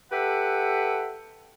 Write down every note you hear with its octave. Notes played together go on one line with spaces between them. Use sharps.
G4 A4 B4 E5 F#5